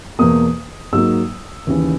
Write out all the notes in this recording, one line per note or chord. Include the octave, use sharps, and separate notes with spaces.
E2 B2 A#3 D#6
G#2 F#3 A#3 E6
D#2 C#3 E3